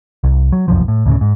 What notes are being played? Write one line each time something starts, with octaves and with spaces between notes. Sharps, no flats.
C2
F#3
E1 C2 F#2 F3
A2
D2 A2 C#3
G#2